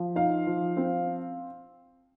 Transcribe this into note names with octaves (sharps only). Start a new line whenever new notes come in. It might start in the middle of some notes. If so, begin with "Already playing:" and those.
Already playing: F3
D#4 F5
F3
C4